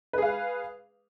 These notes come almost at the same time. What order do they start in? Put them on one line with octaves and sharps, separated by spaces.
B4 G#4 F5